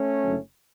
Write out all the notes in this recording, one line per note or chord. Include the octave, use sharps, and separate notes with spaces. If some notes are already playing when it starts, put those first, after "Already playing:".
Already playing: A3 C#4
F#1 F#2 D3 F#3